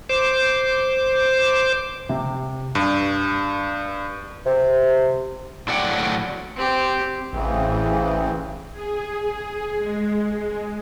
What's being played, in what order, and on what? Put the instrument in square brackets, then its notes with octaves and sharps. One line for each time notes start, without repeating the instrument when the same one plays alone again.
[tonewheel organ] C5 D6
[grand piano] C3
[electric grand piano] G2
[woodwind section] C3
[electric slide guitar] A2 F#3 D5 F#5 G5
[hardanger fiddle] C4 G4
[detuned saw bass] A1 [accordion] C#3 E3 C4
[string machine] G#4
G#3